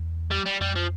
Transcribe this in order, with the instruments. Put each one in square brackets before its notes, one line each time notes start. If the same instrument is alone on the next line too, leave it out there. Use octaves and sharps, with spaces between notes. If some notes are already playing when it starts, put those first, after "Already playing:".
Already playing: [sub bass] E2
[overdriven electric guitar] G3
G3
[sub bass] F2 [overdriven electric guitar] G3
[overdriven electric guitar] F3